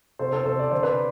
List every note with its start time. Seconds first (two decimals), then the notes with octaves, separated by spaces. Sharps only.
0.19 C3 A4 C5
0.32 A4 C5
0.45 C3 A4 C5
0.59 D5
0.71 D3 C5
0.82 B4 D5